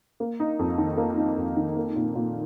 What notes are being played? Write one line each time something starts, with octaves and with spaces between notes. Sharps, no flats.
A#3
D#4
F2
D#3
A#3
D#4
F2
D#3
A#3
A#2
A#2